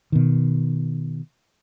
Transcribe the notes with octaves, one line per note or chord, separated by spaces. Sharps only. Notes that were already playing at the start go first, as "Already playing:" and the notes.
B2 D#3